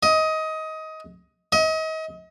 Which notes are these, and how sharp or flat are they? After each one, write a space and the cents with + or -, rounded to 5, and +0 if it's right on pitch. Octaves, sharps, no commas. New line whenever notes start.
D#5 +20
D#5 +35